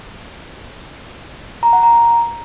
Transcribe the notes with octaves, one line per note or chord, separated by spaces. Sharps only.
A#5
F#5
A#5